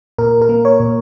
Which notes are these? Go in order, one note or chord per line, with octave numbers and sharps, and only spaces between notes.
A#2 A#4
A#4
A#3
C#5
A#2